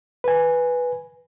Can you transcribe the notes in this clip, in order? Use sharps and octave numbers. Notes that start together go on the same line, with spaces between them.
B4 G#5